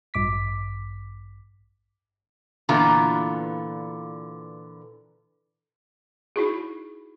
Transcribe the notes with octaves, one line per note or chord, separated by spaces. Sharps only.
A1 G2 D6 B6
A#2 D3 E3 B3 F4 A#5
D#4 E4 F#4 G#4